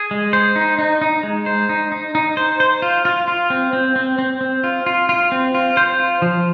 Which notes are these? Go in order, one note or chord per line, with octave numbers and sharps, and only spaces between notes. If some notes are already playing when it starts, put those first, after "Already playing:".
Already playing: G#4
G#3
C5
D#4
D#4
D#4
G#3
C5
D#4
D#4
D#4
C5
C5
F4
F4
F4
C4
C4
C4
C4
C4
F4
F4
F4
C4
F4
C5
F4
F3